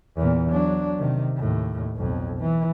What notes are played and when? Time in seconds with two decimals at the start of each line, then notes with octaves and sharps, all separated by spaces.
0.16 E2 A#2
0.51 F#3 D4
0.98 C3 D#3
1.36 D#2 A2
1.96 B1 F2
2.40 E3